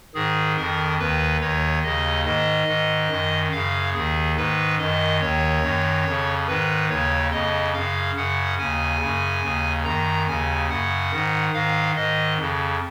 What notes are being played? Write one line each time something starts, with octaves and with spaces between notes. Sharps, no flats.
G#2 D#3 G#4
F2 D#3 A#4
D#2 D#3 B4
D#2 D#3 C#5
D#2 C#3 D#5
G#2 D#3 D#5
G#2 D#3
F#2 D#3
F#2 C#3 F5
D#2 D#3 G#4
G#2 D#3 B4
F#2 D#3 D#5
D#2 D#3 C#5
F#2 D#3
F2 C#3
G#2 D#3 B4
D#2 C#3 C#5
F2 C#3 D#5
F#2 C#3 F5
F#2 C#3 F#5
D#2 C#3 G#5
F#2 C#3
D#2 C#3
F#2 D#3 A#5
D#2 C#3 G#5
F#2 C#3 F#5
G#2 D#3
G#2 D#3 F5
G#2 D#3 D#5
F2 C#3